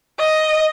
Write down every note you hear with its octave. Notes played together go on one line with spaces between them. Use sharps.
D#5